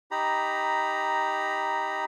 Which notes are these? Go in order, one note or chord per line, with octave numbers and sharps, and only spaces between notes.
D#4 G4 A#5 B5